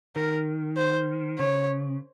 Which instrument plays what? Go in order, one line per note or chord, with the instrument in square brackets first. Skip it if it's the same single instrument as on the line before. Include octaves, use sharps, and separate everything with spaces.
[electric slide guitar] D#3 [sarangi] A#4
[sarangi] C5
[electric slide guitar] C#3 [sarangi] C#5